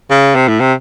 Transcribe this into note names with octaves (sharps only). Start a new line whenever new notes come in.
C#3
C3
A2
C3